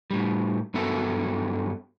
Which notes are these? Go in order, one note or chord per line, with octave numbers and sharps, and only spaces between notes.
A2 G3
G2 F#3 B3 A4 E5